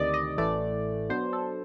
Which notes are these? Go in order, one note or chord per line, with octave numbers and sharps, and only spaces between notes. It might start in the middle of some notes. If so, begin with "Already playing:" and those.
Already playing: D2 C3 D#3 D5 D#5
D#5
A1 A2 E3 A3 D5
B2 F#3 B3 D4 C5
A4